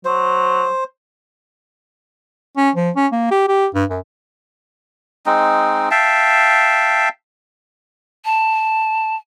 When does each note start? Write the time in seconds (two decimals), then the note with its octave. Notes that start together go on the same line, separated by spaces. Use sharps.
0.05 F#3 C5
2.57 C#4
2.76 F3
2.96 C#4
3.12 A#3
3.31 G4
3.48 G4
3.74 G2
3.90 F#2
5.26 G#3 C4 D#4
5.91 E5 F5 G5 A5
8.25 A5